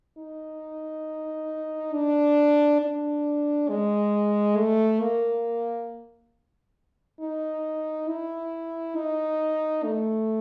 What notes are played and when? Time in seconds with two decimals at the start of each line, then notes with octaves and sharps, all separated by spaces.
0.18 D#4
1.93 D4
2.81 D4
3.69 G#3
4.57 A3
5.01 A#3
7.21 D#4
8.08 E4
8.96 D#4
9.84 A3